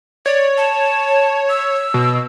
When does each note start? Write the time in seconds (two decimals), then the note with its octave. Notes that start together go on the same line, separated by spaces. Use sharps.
0.26 C#5 D5
0.58 A5
1.49 E6
1.94 B2